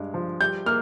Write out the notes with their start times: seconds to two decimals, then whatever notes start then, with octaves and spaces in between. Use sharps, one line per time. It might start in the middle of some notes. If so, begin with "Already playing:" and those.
Already playing: G2 G#3
0.14 F3
0.41 G3 G6
0.66 A#3 F6